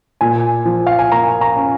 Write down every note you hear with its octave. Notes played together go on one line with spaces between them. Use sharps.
A#2 G#5
F3
F5
G#5
A#3 A#5
A#5
C#4